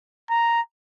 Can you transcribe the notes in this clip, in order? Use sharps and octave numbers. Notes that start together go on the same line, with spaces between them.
A#5